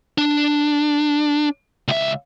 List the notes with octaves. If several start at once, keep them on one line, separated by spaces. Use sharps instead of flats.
D4
C#2 E5